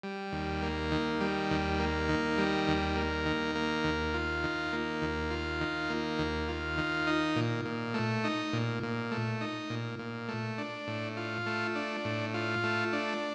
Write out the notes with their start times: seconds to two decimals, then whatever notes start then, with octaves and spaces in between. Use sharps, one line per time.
0.03 G3
0.32 D#2
0.62 A#3
0.92 D#3
1.21 G3
1.51 D#2
1.79 A#3
2.09 D#3
2.38 G3
2.67 D#2
2.96 A#3
3.26 D#3
3.55 A#3
3.84 D#2
4.14 F4
4.44 D#3
4.73 A#3
5.02 D#2
5.31 F4
5.61 D#3
5.90 A#3
6.19 D#2
6.48 F4
6.78 D#3
7.07 D#4
7.36 A#2
7.65 A#2
7.94 A3
8.24 D#4
8.53 A#2
8.83 A#2
9.11 A3
9.41 D#4
9.70 A#2
9.99 A#2
10.28 A3
10.58 D4
10.88 A2
11.17 F4
11.46 A3
11.75 D4
12.05 A2
12.34 F4
12.63 A3
12.93 D4